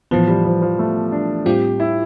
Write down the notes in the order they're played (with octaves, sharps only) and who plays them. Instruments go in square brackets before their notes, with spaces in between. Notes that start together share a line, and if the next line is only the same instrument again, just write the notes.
[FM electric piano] A2 E3 B3 [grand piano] F3
[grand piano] G3
F3
F3
A3
D4
[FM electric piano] A2 G3 C4 F4 [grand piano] G4
[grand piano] E4